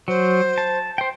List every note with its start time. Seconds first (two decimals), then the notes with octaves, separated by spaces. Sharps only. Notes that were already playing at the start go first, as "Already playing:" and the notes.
0.08 F#3 C5
0.58 A5
0.98 C5 G5